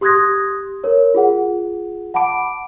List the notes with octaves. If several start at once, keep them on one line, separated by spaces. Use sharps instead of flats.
G4 C6 D#6 F#6 G#6 A#6
A#4 C#5
F4 G#4 F#5
F#5 A5 B5 D6 D7